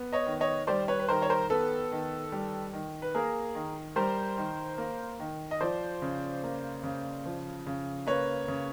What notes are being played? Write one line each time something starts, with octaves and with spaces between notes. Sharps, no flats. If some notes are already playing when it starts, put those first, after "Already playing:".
Already playing: B3
C#5 D#5
D#3
C#5 D#5
G3 C5 D5
B4 C#5
B4
D#3 A#4 C5
C#5
A#4 C5
B3 A4 B4
D#3
G3
D#3
B4
A#3 G#4 A#4
D#3
G3 A#4 C5
D#3
A#3
D#3
D#5
F3 C5 D5
C#3
A#3
C#3
F3
C#3
A#3 B4 C#5
C#3